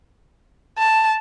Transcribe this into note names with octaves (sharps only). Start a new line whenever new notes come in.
A5